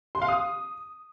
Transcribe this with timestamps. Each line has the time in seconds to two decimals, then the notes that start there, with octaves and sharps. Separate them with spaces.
0.15 C6
0.22 F5
0.28 D#6